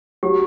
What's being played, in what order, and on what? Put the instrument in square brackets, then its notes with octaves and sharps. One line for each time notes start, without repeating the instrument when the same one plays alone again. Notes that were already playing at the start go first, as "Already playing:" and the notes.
[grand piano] F#3 [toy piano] G4